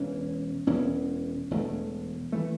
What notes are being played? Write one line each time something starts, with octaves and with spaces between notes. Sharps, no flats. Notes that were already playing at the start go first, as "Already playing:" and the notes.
Already playing: E1 E2 E3 C#4
E1 E2 E3 C#4
E1 E2 E3 A3
E3 A3